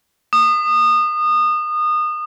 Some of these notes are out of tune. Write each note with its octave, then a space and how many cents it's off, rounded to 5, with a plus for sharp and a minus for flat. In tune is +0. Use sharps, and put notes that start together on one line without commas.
D#6 -25